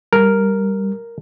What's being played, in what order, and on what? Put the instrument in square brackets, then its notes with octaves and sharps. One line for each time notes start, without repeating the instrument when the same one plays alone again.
[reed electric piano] G3 [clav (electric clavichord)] A#4